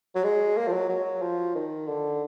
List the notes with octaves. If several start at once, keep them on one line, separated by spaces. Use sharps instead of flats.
F#3
G#3
A#3
F3
F#3
F#3
F3
D#3
D3